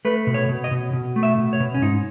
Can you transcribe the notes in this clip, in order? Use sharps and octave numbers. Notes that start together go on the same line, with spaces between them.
A3 B4
B2
C#5
B2
D#5
B2
B2
A3
E5
B2
C#5
B2
C#4
G#2 D#4